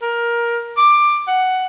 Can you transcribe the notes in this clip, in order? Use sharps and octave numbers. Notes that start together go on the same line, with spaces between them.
A#4
D6
F#5